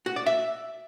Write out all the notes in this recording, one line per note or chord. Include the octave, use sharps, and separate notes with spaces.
F#4
D5
E5